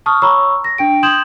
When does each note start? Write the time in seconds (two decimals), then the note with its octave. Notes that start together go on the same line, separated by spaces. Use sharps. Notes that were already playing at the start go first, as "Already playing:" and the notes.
0.06 A5 C#6 D#6 F6
0.22 C#5 A#5 B5 C#6 E6
0.64 A#6
0.78 D4 G5 D7
1.03 C6 D#6 G6 G#6 E7 F#7